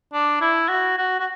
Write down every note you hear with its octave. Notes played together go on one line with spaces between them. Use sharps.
D4
E4
F#4
F#4
F#4